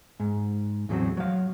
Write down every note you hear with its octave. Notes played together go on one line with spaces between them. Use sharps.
G#2
E2 A2 E3 F#3 C4
F#3 F5